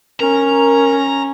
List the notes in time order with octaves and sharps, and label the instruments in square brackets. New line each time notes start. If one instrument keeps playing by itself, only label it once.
[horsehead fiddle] C#4 [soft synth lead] A#4 [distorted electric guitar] A#5